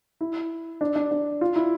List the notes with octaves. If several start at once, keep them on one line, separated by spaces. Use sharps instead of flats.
E4
D4
D4
D4
F4
E4